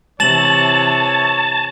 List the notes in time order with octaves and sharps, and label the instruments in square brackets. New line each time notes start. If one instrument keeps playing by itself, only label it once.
[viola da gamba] C3 E3 [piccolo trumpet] C#5 [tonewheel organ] A5 [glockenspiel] A6 E7 F#7